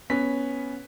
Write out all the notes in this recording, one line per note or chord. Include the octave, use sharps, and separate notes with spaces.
B3 C#4 B6